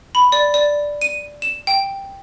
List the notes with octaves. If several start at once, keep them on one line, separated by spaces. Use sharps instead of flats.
B5
D5
D5
D#7
E7
G5